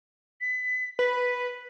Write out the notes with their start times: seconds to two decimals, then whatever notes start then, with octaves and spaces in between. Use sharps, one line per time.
0.41 B6
0.99 B4 B6